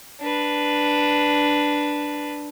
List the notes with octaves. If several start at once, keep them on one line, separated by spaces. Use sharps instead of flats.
D4 B4